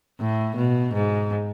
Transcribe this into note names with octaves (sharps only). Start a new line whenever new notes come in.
A2
B2
G#2